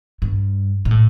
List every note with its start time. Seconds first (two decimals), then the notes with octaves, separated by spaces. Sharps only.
0.22 G2
0.85 A#2
0.91 A2